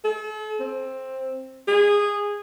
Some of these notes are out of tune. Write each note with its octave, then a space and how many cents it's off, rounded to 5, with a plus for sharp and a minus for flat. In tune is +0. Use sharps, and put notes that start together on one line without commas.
A4 -40
C4 +10
G#4 -15